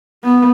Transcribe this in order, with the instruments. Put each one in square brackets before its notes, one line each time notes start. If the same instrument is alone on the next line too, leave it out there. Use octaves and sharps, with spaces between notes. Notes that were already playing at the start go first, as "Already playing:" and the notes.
[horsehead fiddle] B3